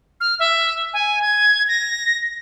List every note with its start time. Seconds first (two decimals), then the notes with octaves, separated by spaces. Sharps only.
0.20 F6
0.39 E5
0.93 G#5
1.22 G#6
1.68 A#6